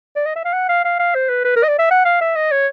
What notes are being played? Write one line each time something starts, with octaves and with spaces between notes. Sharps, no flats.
D5
D#5
E5
F5
F#5
F5
F5
F5
C5
B4
B4
A#4
D#5
D5
E5
F#5
F5
E5
D#5
C#5